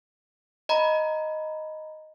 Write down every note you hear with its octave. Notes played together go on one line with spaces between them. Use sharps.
D#5 A#5 B5